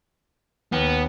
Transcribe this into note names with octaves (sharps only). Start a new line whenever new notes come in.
D#2 B3